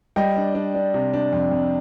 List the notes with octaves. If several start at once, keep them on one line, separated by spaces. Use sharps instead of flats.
G3 D#5 G5
D4
D4
D4
C3
D4
F2
F2